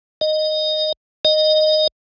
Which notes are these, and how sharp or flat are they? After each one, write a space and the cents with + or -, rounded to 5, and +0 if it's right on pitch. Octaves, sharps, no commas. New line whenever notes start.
D#5 -10
D#5 -10